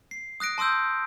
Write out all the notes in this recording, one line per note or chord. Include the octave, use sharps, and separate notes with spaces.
C7
D#6 F#6 A#6 D7
A5 C6 D#6 E6 G6